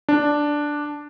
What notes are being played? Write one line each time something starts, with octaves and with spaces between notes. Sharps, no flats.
D4